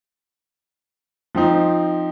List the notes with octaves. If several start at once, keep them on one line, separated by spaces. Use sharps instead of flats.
F3 C4 D#4